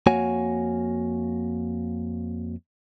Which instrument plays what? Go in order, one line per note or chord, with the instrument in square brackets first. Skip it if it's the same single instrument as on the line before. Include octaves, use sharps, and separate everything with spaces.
[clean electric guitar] F2 A#3 F#4 C#5 F#5 G#5